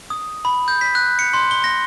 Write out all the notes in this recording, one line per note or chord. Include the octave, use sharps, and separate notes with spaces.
D#6
B5
G6
B6
F#6
C#7
C6
G7
A#6